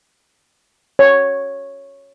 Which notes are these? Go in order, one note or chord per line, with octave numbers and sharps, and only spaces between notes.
C#5